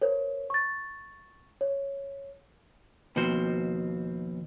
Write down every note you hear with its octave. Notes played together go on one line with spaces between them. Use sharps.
A#4 C5 C#5
C#6 A6
C#5
D#2 B2 F3 C4 C5